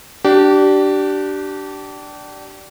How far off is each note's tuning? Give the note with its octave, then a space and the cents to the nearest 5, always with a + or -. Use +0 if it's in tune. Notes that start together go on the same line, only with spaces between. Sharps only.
D4 +0 G4 -30